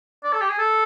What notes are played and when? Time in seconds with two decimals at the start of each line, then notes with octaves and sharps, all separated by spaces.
0.24 D5
0.33 A4
0.41 G4
0.49 G#4
0.58 A4